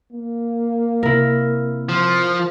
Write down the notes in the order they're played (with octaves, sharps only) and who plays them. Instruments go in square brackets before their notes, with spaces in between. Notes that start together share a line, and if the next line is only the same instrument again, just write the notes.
[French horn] A#3
[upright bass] C3 [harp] E4 A#4
[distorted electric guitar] F3